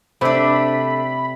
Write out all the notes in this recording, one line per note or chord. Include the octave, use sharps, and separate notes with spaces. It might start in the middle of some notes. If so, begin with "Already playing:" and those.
C3 A3 D4 D5 B5